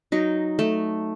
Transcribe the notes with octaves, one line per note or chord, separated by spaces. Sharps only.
F#3 D#4
A3